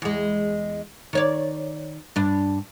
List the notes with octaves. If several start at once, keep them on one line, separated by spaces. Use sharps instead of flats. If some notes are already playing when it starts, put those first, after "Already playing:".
E2 G#3
D#3 C#5 D5
G2 D4